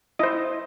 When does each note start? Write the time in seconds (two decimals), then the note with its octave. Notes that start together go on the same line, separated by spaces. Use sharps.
0.19 E4 C5 D#5